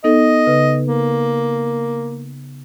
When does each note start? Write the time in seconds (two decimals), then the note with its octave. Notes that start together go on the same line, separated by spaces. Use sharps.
0.04 B3 D#4 A4 D#5
0.47 C#3 B4
0.87 A#3